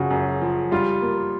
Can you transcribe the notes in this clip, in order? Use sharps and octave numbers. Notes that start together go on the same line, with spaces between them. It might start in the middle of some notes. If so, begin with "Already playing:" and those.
Already playing: F#1 C#3 F3 F#4
F#2
F3
G3 F4
A#3